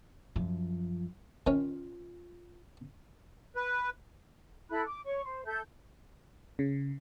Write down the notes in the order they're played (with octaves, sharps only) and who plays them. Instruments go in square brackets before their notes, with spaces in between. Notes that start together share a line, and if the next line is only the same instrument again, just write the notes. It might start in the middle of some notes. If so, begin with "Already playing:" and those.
[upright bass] F#2 F3
[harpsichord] D#3 C#4 [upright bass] F4
[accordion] B4
[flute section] E4 A4 B5 F#6
D6
C#5 C#6
C5
A4 E5 G6
[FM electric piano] C#3